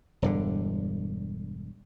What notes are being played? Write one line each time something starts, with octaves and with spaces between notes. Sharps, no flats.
E1 G2 D3